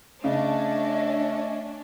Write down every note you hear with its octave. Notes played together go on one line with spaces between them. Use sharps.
C#3 A3 C#4 D4 D#5